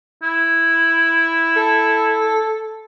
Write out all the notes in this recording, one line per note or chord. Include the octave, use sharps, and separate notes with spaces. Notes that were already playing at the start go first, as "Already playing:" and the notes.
E4
A4